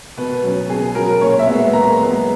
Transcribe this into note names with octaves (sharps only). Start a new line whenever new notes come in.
B2 B4
F#3 C#4
B2 G#4
F#3 C#4 A#4
A#2 C#5
E5
G#3 B3
A#2 A#5
G#3 B3